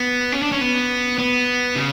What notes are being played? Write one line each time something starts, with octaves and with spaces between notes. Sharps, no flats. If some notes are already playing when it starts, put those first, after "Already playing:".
Already playing: B3
C#4
D4
C#4
B3
B3
C#3